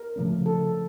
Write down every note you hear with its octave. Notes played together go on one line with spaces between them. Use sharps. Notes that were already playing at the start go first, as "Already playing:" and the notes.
Already playing: A#4
C#3 F3 A3 C#4
A4